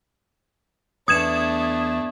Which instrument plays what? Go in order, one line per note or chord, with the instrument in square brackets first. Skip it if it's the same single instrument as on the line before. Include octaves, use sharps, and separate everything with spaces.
[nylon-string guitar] E2 [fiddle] A3 D4 [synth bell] D#6 G#6 E7